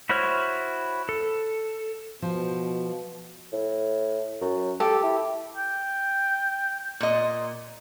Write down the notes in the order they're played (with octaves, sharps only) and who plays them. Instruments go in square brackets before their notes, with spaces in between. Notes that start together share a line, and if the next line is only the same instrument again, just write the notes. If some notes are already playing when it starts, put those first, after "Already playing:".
[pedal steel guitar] E4 F#4 C5 C#5 F6
A4
[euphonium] B2 [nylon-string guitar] F3
[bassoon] A2
F#2
[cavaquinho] G4 [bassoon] A4
[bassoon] E4
[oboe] G5
[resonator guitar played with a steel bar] A#2 D#5